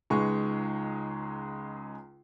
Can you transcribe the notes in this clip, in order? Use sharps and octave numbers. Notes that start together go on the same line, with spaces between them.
C#2 G#3 D#4 G#4 B4 C#6